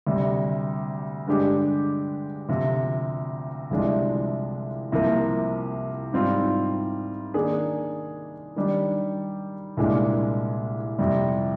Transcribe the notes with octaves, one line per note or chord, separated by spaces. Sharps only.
D2 C3 G3
G2 D3 G#3 D4 G4
D2 C3 F3
C2 C3 F3 G#3 D4
C2 C3 F3 A#3
G#2 G3 C4 F4
D#3 A#3 D4 G#4
D#3 G3 D4
C2 A#2 G#3 D4
F2 C3 G3